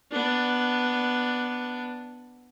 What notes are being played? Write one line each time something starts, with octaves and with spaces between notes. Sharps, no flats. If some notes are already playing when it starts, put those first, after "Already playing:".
B3 D4